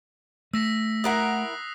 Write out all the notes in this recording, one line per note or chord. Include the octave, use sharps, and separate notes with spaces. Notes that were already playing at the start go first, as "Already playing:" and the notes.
A3 E6 A#6 B6
E4 A#4 F#5 D#6 F#6 C7